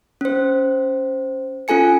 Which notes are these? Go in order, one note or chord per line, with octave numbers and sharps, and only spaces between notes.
C#4 C5
C#4 F4 A4 G#5 C#7